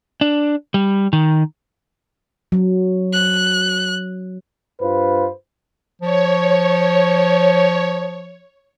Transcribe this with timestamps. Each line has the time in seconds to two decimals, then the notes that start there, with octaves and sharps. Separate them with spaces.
0.21 D4
0.74 G3
1.13 D#3
2.52 F#3
3.13 F#6
4.81 G2 F4 B4 C5
6.02 F3 C#5